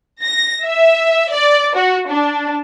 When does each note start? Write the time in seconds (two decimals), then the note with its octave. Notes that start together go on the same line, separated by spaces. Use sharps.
0.22 A#6
0.65 E5
1.32 D5
1.75 F#4
2.09 D4